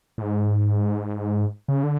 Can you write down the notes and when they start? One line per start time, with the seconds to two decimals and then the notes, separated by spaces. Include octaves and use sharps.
0.18 A2
0.22 G#2
1.68 C#3
1.84 D3